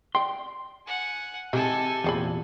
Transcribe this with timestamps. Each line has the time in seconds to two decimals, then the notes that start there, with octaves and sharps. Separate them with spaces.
0.15 D5 G5 C6
0.87 F#5 G#5
1.53 C3 D#3 E3 G#3 A4 G#5
2.04 E2 A#2 F3 G#4 B5